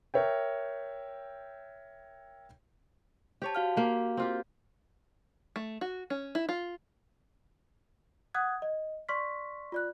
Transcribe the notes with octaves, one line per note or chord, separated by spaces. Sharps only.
A#4 C#5 E5 G5
G4 C5 C#5 A5
F#4 F5 F6
A#3 G4
C4 F4 G4
A3
F#4
C#4
E4
F4
F#5 D#6 F#6 G#6
D#5
D5 C6 C#6 F6 B6
F4 D5 F#6